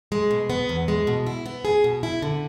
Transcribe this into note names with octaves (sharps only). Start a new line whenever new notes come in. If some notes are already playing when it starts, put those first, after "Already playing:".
G#3
B2
B3
E2
G#3
B2
E4
B3
G#4
B2
E4
D3